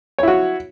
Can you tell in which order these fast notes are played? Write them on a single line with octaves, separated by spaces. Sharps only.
C#5 E4 F#4